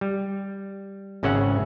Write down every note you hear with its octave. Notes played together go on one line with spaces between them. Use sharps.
G3
G#1 C#3 C#4 E5 F#5